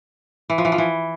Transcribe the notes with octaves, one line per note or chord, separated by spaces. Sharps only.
E3
F3
E3
F3
E3